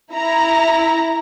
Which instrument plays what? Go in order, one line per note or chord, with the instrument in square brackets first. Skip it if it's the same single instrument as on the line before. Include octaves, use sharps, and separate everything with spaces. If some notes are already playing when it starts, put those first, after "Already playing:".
[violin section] E4 A#5